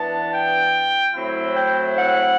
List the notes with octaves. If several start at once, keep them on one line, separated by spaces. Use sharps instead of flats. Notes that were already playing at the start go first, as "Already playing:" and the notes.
Already playing: E3 B3 D4 A5
G5
A2 F#3 C4 E4
G5
F#5